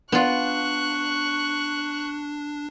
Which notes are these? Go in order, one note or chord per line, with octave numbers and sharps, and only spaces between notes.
B3 D4 F4 C#6 F#6